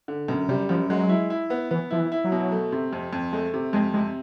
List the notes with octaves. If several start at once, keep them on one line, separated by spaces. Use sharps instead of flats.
D3
F#2 B2
C3 G3
F#2 F3
F#3 G#3
E4
E4
B3
E3 B3
F3 E4
E3
E4
F#3
B2
A3
C3
F2
F2
G#3 A3
C3
F2 G#3
C3 G#3